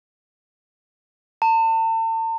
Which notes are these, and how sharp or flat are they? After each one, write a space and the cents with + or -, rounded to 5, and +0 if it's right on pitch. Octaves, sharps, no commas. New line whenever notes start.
A5 +40